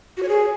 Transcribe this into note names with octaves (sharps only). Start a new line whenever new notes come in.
F#4
C#5
G#4